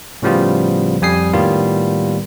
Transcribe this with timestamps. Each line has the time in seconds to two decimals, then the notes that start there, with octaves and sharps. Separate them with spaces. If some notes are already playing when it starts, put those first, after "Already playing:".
0.22 A2 C#3 F3 G3 B3 F4
1.02 F2 G3 G#5 D#6 C7
1.33 A2 D#3 G3 A#3 B3 F4